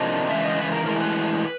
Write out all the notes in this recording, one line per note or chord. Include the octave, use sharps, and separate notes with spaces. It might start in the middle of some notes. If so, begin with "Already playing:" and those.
Already playing: F2 C3 F3 A#3 D4 D#5
C#3 E3 G#3 E5
D#5
B4
A#4
A2 E3 G#3 A#4
B4